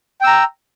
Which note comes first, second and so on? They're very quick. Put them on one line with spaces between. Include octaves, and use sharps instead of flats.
G5 E6 A#5